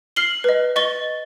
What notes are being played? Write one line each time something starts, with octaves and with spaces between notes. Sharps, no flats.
F6 C7 F#7 G7
B4 D#5
D#5 C#6 A6 G7